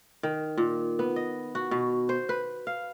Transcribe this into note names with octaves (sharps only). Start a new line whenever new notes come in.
D#3
A#2
B3
D#5
F#4
B2
C5
B4
F5